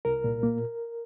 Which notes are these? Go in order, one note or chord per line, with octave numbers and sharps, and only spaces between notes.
C2 A#4
A#2
A#3